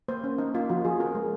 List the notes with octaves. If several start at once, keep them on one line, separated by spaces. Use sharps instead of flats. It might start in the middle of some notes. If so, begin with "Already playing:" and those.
A#3 C5
C#4
A#3 D#4
A#3 F4
F3 F#4
F3 G#4
C4 A#4
G#3